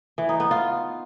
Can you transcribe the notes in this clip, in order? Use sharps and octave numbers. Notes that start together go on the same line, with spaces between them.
E3
D#4
B3
F4